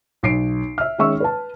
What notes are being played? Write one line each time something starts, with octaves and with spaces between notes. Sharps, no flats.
B1 C7 D7
E5 F6
D#3 G#3 C#4 E5 C#6 E6
B4 A5